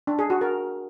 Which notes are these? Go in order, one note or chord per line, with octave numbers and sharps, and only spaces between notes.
D4
G#4
F#4
A#4